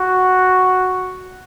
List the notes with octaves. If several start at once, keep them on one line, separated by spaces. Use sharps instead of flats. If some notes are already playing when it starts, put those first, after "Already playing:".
Already playing: F#4